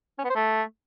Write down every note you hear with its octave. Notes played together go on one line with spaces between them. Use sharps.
C#4
B3
C5
A3